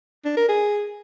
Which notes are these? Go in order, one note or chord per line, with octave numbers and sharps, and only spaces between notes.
D4
A#4
G#4